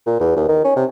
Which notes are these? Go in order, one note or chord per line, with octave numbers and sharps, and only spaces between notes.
A#2
E2
D#2
D#3
C#4
C3